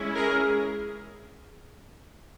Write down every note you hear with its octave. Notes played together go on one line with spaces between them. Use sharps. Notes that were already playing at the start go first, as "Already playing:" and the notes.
Already playing: G#3 C#4 E4
G#4 A#4